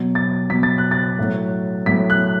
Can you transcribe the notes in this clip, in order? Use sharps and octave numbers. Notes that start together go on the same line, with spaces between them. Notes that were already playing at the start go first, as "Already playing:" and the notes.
Already playing: B2 F#3
A6
B2 F#3 B6
A6
F#6
A6
A2 F#3
A2 F#3 B6
F#6